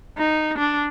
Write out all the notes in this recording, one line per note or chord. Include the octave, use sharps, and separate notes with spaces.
D#4
D4